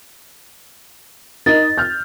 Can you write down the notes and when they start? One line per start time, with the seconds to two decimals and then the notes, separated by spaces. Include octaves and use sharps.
1.46 D#4 A#4 D#5 A6
1.78 F6 G6